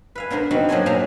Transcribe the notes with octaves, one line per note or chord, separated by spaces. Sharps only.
B4 F5 G#5
B3 D4 A#4 C5
B3 C4 D4 D#4 F#4
F3 F#3 A#3 D4 C5 G#5
A#2 F#3 C#4 C5 A5 A#5